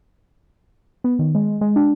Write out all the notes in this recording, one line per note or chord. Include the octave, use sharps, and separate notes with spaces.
B3
D#3
G#3
G#3
D4